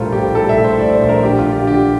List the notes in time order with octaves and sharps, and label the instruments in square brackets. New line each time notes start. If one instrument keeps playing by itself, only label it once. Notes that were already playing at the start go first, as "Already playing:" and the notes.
Already playing: [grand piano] A#1 A2 G3 F4 A4 A#4 C5
A2 G4
G3 A4
E5
A2
C5
A2 D5
C5
A#1
A#4
D3 G4
F4
D3
G4
D3 G4